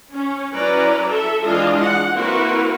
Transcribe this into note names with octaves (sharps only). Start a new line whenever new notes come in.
C#4
F#3 C#4 E4 B4 D5 A#5
A4 E5
E3 G#3 D4 F4 D#5 F5
F#5
A#3 C4 E4 F#4 A#4 B4